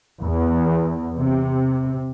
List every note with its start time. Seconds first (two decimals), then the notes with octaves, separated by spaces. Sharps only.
0.21 E2
1.17 C3